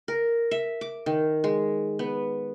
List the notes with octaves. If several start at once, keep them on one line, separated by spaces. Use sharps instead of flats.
A#4
E5
D6
D#3
G#3
B3